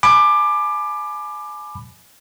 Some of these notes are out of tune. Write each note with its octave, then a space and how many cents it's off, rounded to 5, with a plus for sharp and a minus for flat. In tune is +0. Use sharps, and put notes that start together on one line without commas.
G#5 +30 B5 +0 D6 +20